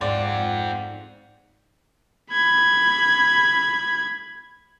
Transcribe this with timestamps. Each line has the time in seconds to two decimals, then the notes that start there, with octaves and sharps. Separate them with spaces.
0.01 G#2 C4 F4 D5 F#5
2.31 B5 G#6